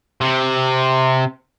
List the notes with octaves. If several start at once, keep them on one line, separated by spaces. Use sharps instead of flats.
C3